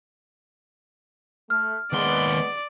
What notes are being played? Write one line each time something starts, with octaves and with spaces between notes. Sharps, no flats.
A3 F6
D#2 G#3 B3 D5 C6